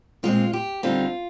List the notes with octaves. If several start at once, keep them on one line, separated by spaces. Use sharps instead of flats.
A#2 G#3 C4 F4
G4
D3 G3 C4 D#4 F4